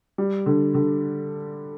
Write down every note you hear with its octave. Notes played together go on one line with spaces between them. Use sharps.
G3
D3
D3